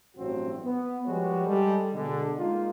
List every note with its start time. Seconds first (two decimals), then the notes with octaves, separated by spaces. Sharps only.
0.16 A1 G2 F#3 C4 F#4
0.64 B3
1.06 F3 G3 G#3 F#4 B4 C#5
1.45 G3 G#3 A4
1.93 B2 D3 G#3
2.37 G#3 A#3 D#4 F4